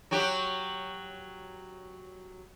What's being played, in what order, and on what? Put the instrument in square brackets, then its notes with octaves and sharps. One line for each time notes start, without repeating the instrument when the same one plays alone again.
[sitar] F#3 F#4 G4